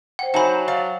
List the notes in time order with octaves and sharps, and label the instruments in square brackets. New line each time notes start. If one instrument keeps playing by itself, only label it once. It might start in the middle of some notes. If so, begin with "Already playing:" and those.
[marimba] C5 G5 [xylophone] F#5
[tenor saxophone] F#3 [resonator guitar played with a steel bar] D#4 C5 [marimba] E5 G#5 A5 [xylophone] F#5 B5
[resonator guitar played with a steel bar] D5 F5